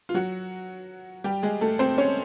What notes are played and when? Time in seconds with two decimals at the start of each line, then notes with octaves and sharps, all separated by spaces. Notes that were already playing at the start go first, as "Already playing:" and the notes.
0.09 F4
0.14 F#3 F#4
1.24 G3 G4
1.43 G#3 G#4
1.61 A3 A4
1.79 C4 C5
1.98 C#4 C#5